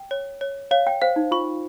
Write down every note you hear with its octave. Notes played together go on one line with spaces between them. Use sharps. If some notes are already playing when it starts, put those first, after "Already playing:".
Already playing: G5
C#5
C#5
C#5 F5
G5
C5 F5
D#4
F4 C#6